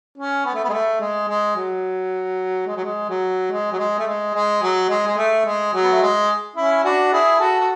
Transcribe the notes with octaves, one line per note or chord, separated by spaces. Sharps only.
C#4
B3
A3
B3
G#3
A3
G#3
G#3
F#3
G#3
F#3
G#3
F#3
G#3
F#3
G#3
A3
G#3
G#3
F#3
G#3
G#3
A3
G#3
F#3
B3
A3
G#3
C#4 E4
D4 F#4
E4 G#4
F#4 A4
F#4